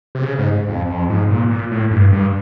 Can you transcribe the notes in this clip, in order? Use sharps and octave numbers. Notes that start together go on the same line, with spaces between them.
C3
C#3
G#2
F2
F2
G#2
A#2
A#2
A2
G2
G2